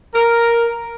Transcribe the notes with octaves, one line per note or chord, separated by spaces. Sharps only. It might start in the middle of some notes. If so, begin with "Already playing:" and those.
A#4